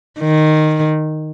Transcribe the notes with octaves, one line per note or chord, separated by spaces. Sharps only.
D#3